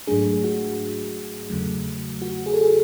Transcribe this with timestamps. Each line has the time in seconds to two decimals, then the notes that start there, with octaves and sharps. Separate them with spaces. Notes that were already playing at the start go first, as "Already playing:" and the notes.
0.07 G#2 F#3 A3 D4 G#4
0.44 F#4
1.50 E2 C#3 F#3 A3
2.22 F#4
2.46 G#4
2.53 A4
2.61 G#4